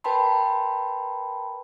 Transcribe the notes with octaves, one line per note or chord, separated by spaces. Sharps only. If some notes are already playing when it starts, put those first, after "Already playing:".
A#4 B4 G5 A5 B5 C6